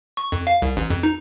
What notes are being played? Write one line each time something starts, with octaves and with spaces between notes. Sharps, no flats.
C#6
F2
F5
C2
A1
F2
D#4